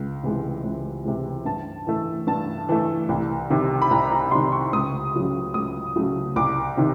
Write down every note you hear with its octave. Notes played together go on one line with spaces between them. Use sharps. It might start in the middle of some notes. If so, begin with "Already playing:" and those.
Already playing: C#2
C3 E3 G#3
C#2
C3 E3 G#3
G2 A5
E3 A3
G2 A5
E3 A3
C2
C3 D#3 G3
B5
C2 A#5
A#5
C3 D#3 G3 C6
C#6
C#2 D#6
C#3 F#3 A3
C#2 D#6
C#3 F#3 A3
C2 D6
C3 D#3